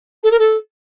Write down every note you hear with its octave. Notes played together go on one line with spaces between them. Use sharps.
A4
A#4
A4